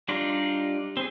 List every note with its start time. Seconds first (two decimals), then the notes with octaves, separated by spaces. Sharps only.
0.08 G3 D4 D#4 F4 D5
0.97 C4 G#4